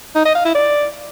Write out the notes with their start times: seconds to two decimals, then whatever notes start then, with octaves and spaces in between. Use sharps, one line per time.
0.15 D#4
0.25 D#5
0.35 F5
0.45 E4
0.55 D5